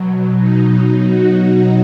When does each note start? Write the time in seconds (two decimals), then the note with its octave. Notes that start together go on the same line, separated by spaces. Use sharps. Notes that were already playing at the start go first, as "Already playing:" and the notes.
Already playing: B2 F#3
0.36 D#4
1.07 F#4